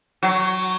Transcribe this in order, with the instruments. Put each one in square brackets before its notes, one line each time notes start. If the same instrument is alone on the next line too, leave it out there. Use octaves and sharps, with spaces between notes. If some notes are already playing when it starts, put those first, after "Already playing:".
[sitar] F#3